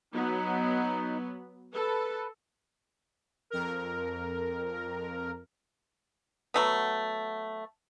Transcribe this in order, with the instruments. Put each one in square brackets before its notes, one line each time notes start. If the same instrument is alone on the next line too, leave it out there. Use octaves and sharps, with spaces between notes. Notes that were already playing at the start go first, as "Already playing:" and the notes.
[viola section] F#3 B3 [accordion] D#4
[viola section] A4 [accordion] B4
[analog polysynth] F2 A#4
[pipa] F#3 A3 B3